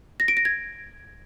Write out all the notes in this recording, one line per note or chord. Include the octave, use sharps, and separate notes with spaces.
A#6
D7
A#6
G#6